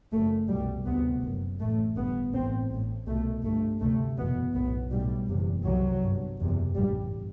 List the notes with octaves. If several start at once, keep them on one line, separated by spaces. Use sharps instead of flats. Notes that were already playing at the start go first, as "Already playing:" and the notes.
F#1 F#2 A3
C2 B2 G3
D2 C3 B3
F#1 F#2
A1 A2 A3
G1 G2 B3
A1 A2 C4
A1 A2
C2 B2 A3
G1 G2 A3
D2 C3 A3
F#1 E2 B2 B3
B1 A2 B3
B1 A2 G3
F#1 E2 C3
C2 C3 F#3
G1 G2
F#1 E2 C3
A1 G2 G3